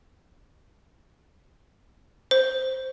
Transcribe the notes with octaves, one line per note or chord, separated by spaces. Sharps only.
C5